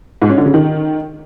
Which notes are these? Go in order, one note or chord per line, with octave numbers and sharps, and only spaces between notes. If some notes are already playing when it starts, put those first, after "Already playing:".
G#2
C#4
D3
C#3
D#3